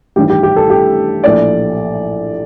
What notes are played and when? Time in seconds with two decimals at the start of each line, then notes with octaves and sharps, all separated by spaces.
0.16 A1 G2 D#3 G3 G4
0.30 G4
0.43 G4
0.57 A4
0.70 G4
1.24 A#1 A2 A3 D5